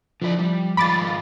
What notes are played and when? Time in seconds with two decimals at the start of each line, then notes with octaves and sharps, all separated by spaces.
0.22 D3 F3 E4 D5
0.39 G3
0.77 G#2 D#3 F4 B5 D6 A6